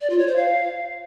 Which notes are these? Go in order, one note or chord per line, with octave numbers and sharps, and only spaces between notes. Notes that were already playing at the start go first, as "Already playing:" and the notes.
D5
F4
C#5
C5
F5